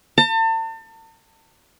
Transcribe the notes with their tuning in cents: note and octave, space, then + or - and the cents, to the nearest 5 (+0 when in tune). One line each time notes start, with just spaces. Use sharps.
A5 +40